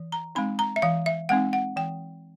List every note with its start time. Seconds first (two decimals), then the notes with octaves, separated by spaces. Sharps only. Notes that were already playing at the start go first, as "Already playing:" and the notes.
Already playing: E3
0.12 A#5
0.35 G#3 C4 D#4 B5
0.59 A#5
0.76 E5
0.82 E3 F5
1.06 E5
1.29 G#3 C4 D#4 F#5
1.53 F#5
1.76 E3 G5